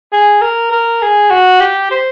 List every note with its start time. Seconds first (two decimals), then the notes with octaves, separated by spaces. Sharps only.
0.12 G#4
0.41 A#4
0.72 A#4
1.02 G#4
1.30 F#4
1.60 G4
1.91 C5